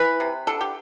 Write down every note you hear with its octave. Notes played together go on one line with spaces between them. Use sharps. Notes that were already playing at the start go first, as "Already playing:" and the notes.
Already playing: E3 B4
C3
D3 A4
G4